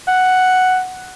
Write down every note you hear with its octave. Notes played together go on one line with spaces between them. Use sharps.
F#5